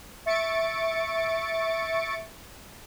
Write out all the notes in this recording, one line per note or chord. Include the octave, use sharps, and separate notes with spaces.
E5 C#6 A6 C#7 D7